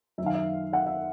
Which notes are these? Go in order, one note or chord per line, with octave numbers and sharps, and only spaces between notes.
F#2 D#3 E5 F5
E5
E5 F#5
E5